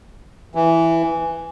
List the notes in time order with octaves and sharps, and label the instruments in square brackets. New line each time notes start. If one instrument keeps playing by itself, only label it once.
[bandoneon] E3